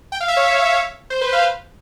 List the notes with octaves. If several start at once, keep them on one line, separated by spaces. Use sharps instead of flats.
G5
F5
E5
C#5
C5
B4
F5